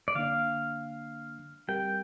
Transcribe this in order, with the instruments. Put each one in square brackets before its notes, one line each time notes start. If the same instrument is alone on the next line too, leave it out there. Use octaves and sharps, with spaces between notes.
[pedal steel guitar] D5
[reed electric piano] D3 A#3 D4 [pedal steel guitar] F5
[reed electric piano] G3 C4 G4 A#4 [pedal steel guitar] G5